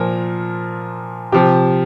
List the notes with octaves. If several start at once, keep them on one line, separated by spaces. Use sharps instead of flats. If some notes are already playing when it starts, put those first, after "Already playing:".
Already playing: A#2 F3 A#4
C3 F3 G4